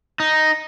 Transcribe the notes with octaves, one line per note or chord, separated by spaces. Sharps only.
D#4